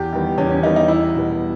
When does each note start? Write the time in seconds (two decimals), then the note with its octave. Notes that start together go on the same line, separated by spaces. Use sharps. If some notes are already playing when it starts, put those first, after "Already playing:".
Already playing: E2 G4
0.13 D#3 G3 B3
0.38 E2 C#4
0.51 C#4
0.63 D#3 G3 B3 D#4
0.76 D#4
0.88 E2 E4
1.14 B2 G3 B3